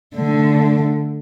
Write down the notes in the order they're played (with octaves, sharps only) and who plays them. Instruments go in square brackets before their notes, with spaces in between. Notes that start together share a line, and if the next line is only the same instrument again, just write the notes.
[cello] D3 A3